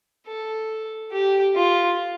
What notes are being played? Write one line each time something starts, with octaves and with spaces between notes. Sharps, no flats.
A4
G4
F4